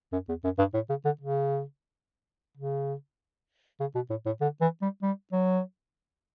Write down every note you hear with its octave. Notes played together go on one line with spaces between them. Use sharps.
F#2
E2
F#2
G2
A2
C#3
D3
C#3
C#3
C#3
B2
A2
A2
D3
E3
G3
G3
F#3